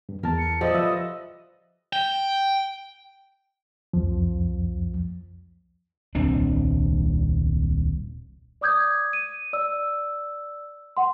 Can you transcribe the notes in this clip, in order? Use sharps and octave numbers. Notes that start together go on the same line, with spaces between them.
G2
E2 A#4 A5
C#7
F3 G3 A4 D#5
F3 B4 E5 E6
G5
C2 F2 F3
D#1 C2 C4 D4
D5 D6 D#6 G6 G#6
D#7
D5 E6
F#5 C6